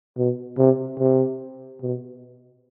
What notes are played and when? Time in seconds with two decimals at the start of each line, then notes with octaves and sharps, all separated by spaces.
0.17 B2
0.58 C3
0.99 C3
1.81 B2